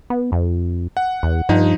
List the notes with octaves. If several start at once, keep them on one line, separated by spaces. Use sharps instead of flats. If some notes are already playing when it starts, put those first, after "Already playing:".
B3
F2
F#5
E2
G2 F3 D#4